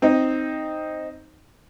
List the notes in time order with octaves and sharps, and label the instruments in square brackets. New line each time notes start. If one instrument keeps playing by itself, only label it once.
[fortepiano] C4 D#4